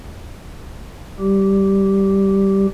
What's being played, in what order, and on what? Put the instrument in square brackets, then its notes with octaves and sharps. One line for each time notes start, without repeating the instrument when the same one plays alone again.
[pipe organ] G3 G4